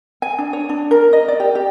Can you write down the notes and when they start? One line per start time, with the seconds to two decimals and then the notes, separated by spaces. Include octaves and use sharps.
0.22 G#5
0.38 D4
0.53 C#5
0.69 D4
0.91 A#4
1.13 D#5
1.28 D5
1.40 G4
1.55 G4